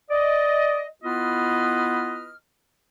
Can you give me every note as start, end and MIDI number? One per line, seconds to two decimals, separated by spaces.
0.10 0.85 74
0.10 0.85 75
1.04 2.33 59
1.04 2.33 64
1.04 2.33 65
1.04 2.33 71
1.04 2.33 75
1.04 2.33 89